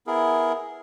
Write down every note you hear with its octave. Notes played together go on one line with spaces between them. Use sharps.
B3 E4 G#4 A#4